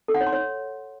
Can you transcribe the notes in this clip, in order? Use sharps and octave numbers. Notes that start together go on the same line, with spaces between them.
A4
F#5
C#5
C6
C#5